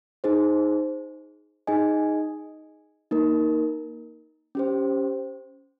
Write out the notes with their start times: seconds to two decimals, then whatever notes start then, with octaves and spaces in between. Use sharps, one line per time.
0.24 D#4 G#4 C5
1.67 D#4 G#4 D#5 G#5
3.11 A#3 D#4 A#4
4.55 C#4 G4 C5